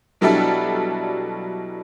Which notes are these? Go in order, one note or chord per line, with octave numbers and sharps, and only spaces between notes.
B2 F#3 G3 D4 E4 A4